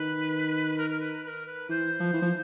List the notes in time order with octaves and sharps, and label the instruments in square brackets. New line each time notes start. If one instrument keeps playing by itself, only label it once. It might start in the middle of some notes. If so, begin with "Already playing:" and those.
Already playing: [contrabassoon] D#3 [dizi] B4
[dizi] A#4
A#4
B4
B4
A#4
B4
[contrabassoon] E3 [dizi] C5
[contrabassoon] F3
E3
F3